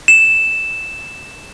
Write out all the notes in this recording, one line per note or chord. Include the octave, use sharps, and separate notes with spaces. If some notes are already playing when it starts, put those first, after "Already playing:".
E7